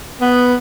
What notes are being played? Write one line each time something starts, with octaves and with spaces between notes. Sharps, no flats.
B3